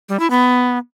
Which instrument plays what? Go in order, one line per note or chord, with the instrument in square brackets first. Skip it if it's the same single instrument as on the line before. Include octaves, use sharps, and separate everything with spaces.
[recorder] G3
E4
B3